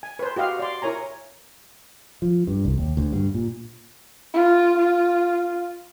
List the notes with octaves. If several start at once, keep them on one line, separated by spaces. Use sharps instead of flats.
G#5
B4 C5
F#4 G4 D#5 F5
D5 C6
E4 A#4 C#5 G#5 A#5
F3
G2
C2
D#2
D2
G2
A#2
F4
F4